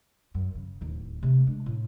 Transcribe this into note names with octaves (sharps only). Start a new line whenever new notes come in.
F#2
C#3
D1 D#2
C3 A3
G#3 D4
A2